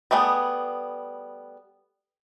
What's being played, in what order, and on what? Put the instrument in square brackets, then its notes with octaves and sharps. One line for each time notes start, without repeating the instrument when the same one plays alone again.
[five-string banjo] G3 A3 B3 G#4